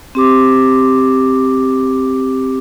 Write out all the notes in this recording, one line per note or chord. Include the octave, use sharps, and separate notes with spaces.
C4 G4 D6